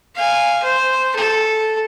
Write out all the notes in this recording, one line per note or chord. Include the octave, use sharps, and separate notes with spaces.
F5 G#5
C5
A4